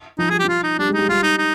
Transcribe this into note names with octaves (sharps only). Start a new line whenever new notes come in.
F3 D#4
G3 G#4
G4
F3 F4
D#4
G3 D4
G#3
G3 D#4
G3 F4
D#4
D#4